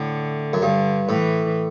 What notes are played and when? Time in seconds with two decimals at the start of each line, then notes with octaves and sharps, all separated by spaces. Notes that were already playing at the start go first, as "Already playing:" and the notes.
Already playing: A2 D3
0.53 F#2
0.61 G2 D3
1.09 A2 E3